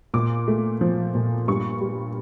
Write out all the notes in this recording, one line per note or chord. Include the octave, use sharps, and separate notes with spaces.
A#2 D6
A3
F3
A#2
G2 C#6
G3